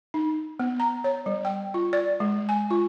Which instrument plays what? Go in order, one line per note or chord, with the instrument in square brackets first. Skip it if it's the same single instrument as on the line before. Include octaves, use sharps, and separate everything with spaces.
[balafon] D#4
B3
A#5
C#5
G3
G5
F4
D5
G#3
G#5
F4